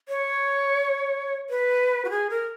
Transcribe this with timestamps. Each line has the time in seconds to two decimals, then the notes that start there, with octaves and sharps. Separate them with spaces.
0.09 C#5
1.50 B4
2.05 F#4
2.10 G#4
2.30 A#4